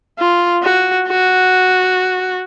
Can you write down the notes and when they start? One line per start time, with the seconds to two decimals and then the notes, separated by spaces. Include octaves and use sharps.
0.19 F4
0.63 F#4
1.08 F#4